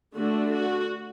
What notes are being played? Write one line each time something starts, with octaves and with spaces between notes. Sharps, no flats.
D3 A3 D4 F#4
F#4